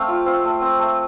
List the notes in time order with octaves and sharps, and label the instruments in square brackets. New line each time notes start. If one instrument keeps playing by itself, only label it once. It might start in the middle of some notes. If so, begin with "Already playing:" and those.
Already playing: [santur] A3 C4 F5 G5
F4
C4 F5
A3
C4
A3